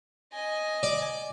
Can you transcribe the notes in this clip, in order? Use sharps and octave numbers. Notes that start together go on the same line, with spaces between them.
D#5 G#5
D5